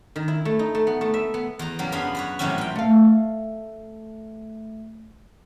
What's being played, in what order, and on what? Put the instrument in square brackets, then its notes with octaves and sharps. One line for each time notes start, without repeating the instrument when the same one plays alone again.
[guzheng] D#3
E4
A3
D#4
A3
B3
A3
E5
B3
E2 A#5
C#3 F#3 G3 A#3
F#2 B3 D4 G#4 F5 B5
F#4 B4 C#5
A2 C3 E3 F#3 G3 C#4
A#2 G5
[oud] A3 F5